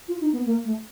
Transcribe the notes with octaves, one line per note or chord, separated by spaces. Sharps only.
F4
D#4
B3
A#3
A3